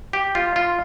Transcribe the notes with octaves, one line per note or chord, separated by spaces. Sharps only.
G4
F4
F4